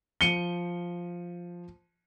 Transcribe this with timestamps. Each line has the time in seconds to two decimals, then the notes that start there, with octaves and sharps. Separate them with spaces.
0.21 F3 C#7 D#7 G7